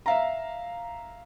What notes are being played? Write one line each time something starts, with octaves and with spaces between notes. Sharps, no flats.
E5 F5 A#5